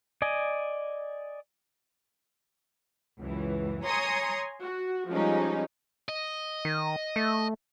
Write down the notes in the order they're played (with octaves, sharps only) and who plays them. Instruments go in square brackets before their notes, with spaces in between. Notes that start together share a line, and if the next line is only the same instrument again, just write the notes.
[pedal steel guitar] D5 D#5 G#5
[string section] C#2 F#2 E3
C#5 G#5 A#5 C6 D#6 C#7
F#4
F3 G3 G#3 C#4 D#4
[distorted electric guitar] D#5
[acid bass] D#3
A3